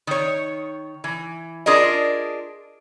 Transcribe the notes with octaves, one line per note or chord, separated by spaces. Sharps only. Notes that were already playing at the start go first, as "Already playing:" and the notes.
D#3 C#5
E3
D4 F4 G#4 A#4 D#5